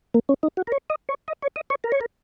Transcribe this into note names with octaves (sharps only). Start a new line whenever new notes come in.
A#3
C#4
D#4
F#4
A#4
C#5
D#5
C#5
D#5
C#5
D#5
C#5
A#4
C#5
A#4